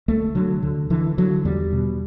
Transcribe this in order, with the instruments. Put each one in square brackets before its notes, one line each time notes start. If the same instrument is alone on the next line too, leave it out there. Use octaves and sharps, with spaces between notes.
[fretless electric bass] D2 A3
D3 F#3
D3
D3 E3
D3 F#3
E2 G3
B2